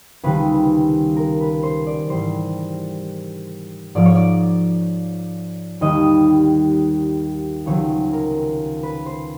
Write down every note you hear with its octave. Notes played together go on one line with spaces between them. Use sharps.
C#2 C3 D#3 G3 B4
A#4
B4
C5
D5
G#2 E3 G3 C5
G#2 F3 D5
C#5
D5
D#2 D#3 G3 D#5
C#2 C3 D#3 F#3 C#5
A#4
B4
C5